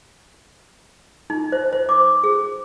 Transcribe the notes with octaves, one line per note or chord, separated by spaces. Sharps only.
D#4
C5
C5
D6
G#4